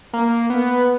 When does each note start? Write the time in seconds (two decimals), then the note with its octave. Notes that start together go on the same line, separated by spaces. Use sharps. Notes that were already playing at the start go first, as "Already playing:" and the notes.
0.13 A#3
0.50 B3